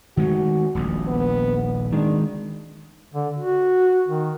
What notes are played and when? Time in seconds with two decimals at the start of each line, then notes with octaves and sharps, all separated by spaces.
0.17 D#3 G#3 A3 F#4
0.75 D#1 A#1
1.07 B3
1.93 D#3 G#3 D4
3.14 D3
3.38 F#4
4.08 D#3